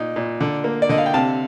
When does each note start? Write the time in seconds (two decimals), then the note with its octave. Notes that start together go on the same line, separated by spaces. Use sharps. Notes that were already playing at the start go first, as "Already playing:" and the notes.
Already playing: A#2 D#4
0.16 A#2
0.41 D3
0.64 A#3
0.82 D5
0.89 D3 D#5
0.98 F5
1.06 G5
1.14 C3 F5 A5